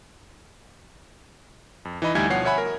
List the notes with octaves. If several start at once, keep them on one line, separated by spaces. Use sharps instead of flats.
F2
E3 D#4 D#5 B5
D2 G3 D#4 E4 G#5 G#6
B2 F3 C#5 F#5 C7
C#5 E5 F#5 G#5 B5
A#4